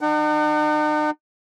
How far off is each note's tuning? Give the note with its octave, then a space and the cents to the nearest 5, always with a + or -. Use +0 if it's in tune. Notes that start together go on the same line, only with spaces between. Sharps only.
D#4 -45 F#5 +30